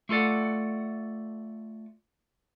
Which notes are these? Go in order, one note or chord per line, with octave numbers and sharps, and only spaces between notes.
A3 F4 A4 D5 F#5